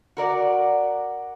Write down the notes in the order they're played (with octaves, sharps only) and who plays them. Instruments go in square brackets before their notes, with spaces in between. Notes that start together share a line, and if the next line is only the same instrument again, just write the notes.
[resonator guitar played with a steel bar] F#4 A#4 D5 F#5